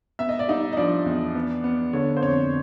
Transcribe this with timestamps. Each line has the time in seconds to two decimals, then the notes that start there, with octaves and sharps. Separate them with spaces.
0.19 B3 E5
0.29 D#5
0.39 D5
0.48 G3 D#4 D#5
0.73 D#5
0.77 F3 D4 D5
1.06 E2
1.35 B3
1.64 B3
1.93 D3 C#5
2.17 C5
2.22 F2 C#5